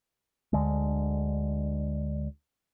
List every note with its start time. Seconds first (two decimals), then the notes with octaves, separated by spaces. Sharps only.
0.53 D2 D3 G#3